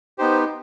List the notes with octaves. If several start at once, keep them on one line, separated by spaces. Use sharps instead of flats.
B3 D#4 G4 C5